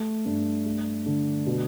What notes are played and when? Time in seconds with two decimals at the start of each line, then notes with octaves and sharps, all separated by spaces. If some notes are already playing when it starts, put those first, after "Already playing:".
Already playing: A3
0.26 G2
0.66 A3
1.06 D3
1.46 B2